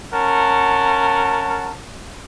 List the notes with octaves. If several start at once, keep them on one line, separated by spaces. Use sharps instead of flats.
C#4 A#4 F#5 A5